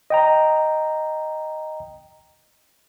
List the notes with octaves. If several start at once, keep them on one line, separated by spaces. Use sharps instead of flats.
D#5 G5 A#5